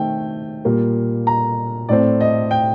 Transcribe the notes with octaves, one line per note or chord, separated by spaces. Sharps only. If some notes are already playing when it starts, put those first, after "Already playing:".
Already playing: D#3 A3 C4 G5
A#2 G3 A#3
A#5
A2 A3 C4 D5
D#5
G5